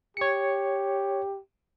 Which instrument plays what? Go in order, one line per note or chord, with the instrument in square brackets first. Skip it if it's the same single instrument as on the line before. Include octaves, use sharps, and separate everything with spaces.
[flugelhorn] G4 [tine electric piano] C#5 C#7